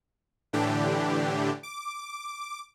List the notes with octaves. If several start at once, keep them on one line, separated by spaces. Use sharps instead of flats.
A2 D3 E3 D4 G4
D6